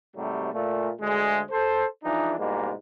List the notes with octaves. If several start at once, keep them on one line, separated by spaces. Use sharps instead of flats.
G#2 C3 F#3 G3 A3
A#2 A3
D2 G#3
A4 C5
E3 F3 G#3 D4 D#4
G#2 B2 E3 G3 A#3